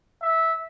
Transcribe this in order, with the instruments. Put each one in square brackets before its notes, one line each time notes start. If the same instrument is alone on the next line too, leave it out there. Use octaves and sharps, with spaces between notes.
[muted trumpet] E5